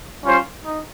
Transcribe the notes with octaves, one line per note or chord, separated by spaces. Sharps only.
G3 C#4 F4 C5
D#4